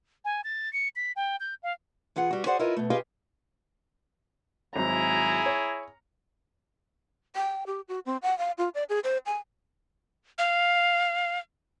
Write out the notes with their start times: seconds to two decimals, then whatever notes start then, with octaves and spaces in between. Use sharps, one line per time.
0.25 G#5
0.44 A6
0.73 C#7
0.96 B6
1.16 G5
1.40 G6
1.63 F5
2.16 E3 F4 G#4 F#5
2.31 G3 F#4
2.45 F#4 G#4 C5 D5 F#5
2.59 E4 F4 A#4 B4 C#5 D#5
2.76 B2 A3
2.90 F4 G4 G#4 B4 D#5 F5
4.76 G#1 F#3 E4 G#4 A#5
5.46 C#5
7.36 G5
7.67 G4
7.88 F#4
8.06 C4
8.22 F#5
8.38 F5
8.58 F4
8.75 D5
8.89 G#4
9.04 C5
9.26 G#5
10.39 F5